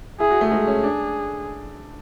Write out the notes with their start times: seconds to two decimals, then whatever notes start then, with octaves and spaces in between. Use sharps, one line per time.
0.20 E4 G#4
0.31 F#4
0.41 A3
0.52 G#3 G#4
0.67 C#4
0.83 D4